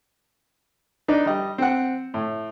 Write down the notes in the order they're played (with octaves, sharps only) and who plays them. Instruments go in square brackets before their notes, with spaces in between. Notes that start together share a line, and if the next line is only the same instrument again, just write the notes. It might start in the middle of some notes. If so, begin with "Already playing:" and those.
[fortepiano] D4 D#4 B4
G3 D#5
C4 F#5
A2